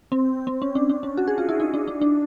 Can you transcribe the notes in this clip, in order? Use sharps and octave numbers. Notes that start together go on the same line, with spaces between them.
C4
C4
C#4
D4
D4
C#4
F#4
G#4
F4
E4
D#4
D4
D4
D4